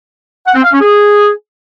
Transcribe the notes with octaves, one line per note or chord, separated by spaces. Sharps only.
F#5
C4
F5
C#4
G#4